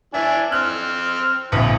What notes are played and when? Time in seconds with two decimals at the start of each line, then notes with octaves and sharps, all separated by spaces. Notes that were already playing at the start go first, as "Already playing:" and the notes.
0.14 E3 D4 E4 G#5
0.52 C4 F6 F#6
1.52 D1 A#1 E3 B4